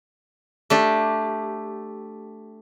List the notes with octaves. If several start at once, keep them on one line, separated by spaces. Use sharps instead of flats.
A3 D4 G4